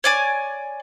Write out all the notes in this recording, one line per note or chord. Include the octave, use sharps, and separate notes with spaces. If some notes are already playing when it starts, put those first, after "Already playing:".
C#5 D5 G#5